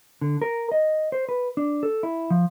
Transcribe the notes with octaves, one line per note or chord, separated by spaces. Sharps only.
D3
A#4
D#5
C5
B4
D4
A4
E4
F3